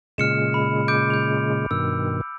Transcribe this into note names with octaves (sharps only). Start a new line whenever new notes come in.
A#2 C#3 G#3 F6 C#7 E7
B5
D6 G6 D7
G6 F7
G2 B2 D#3 E6